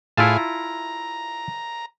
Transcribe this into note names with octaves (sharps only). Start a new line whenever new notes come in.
A2 E4 F4 G#4 F5 A5
A#5